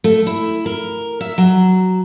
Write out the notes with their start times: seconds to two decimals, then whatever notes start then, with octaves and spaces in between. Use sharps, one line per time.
0.04 A3
0.27 E4
0.66 A#4
1.21 E5
1.38 F#3